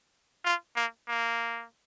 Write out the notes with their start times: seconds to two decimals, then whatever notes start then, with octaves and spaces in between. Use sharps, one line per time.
0.45 F4
0.76 A#3
1.08 A#3